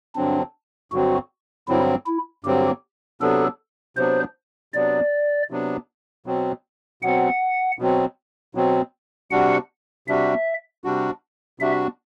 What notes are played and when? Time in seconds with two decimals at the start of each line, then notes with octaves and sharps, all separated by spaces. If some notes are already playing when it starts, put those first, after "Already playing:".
0.16 G2 D3 F#3 C4 D4
0.92 G2 D3 F#3 C4 F#4
1.68 G2 D3 F#3 C4 E4
2.06 E4
2.44 G2 D3 F#3 C4 G4
3.21 C3 F#3 B3 D4 A4
3.97 C3 F#3 B3 D4 C5
4.74 C3 F#3 B3 D4 D5
5.50 C3 F#3 B3 D4
6.26 B2 F#3 C4
7.02 B2 F#3 C4 F#5
7.79 B2 F#3 C4
8.55 B2 F#3 C4
9.31 C3 G3 D4 F#4 F#5
10.08 C3 G3 D4 F#4 E5
10.84 C3 G3 D4 F#4
11.60 C3 G3 D4 F#4 E5